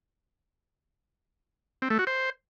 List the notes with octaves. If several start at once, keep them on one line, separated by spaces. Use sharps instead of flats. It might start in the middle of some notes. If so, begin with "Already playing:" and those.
C4
A3
F#4
C5